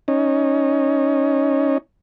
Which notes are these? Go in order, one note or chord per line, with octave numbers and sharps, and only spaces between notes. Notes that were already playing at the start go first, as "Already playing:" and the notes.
C#4 D#4